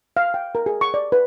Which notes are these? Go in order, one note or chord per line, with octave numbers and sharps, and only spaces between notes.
F5
G5
A#4
G#4
C#6
D5
B4